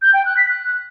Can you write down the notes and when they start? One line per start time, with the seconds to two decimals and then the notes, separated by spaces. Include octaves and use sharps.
0.02 G6
0.14 G5
0.25 F#6
0.37 B6
0.49 F#6